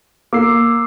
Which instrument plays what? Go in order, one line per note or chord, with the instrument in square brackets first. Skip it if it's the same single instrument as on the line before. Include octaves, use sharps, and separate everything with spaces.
[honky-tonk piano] A#3 [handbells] D6 E6 C7